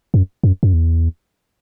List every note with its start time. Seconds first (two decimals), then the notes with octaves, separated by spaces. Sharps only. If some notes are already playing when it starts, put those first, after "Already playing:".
0.14 F#2
0.44 F#2
0.63 F#2
0.73 E2